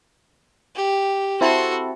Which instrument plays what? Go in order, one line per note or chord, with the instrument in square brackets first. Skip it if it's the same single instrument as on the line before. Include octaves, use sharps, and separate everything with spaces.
[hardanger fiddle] G4
[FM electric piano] C4 E4 A4 [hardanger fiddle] F#4 C6